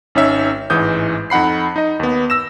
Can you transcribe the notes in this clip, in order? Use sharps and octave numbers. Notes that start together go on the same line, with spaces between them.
G#1 C#4 D#4 C#5 E5
A1 G#2 E3 D#6 G6
F2 D#4 F#5 B5 C7
D#4 D#5
D#2 B3
E6 A#6 E7